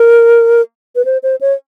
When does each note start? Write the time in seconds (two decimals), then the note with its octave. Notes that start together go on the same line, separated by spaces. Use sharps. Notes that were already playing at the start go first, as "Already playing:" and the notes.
Already playing: A#4
0.96 B4
1.05 C5
1.23 C5
1.41 C#5